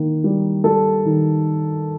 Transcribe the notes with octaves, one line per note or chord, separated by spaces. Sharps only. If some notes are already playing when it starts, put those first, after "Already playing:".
Already playing: D#3 A#3
G3
G3 A4
D#3